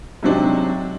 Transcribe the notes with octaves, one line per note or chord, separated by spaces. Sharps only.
G#2 C3 F#3 C4 D4 D#4